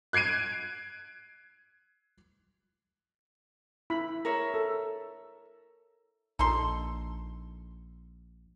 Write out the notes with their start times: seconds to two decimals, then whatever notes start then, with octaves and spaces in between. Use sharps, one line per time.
0.13 F#6 G#6 C7 D7 D#7
3.90 E4 B5
4.25 A#4 C#5 E5
4.54 A4
6.39 A#1 D#4 A4 C6